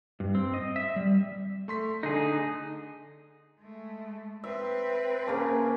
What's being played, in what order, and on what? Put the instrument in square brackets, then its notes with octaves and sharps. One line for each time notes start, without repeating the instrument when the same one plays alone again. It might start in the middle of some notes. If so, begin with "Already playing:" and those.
[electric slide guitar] G2
C4
D#5
E5
G3
[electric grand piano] A3 C6 B6
[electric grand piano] D3 [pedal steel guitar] D#4 G#4
[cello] G#3 A3
[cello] C4 B4 [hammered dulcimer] E5
[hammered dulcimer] C#3 A#3 A5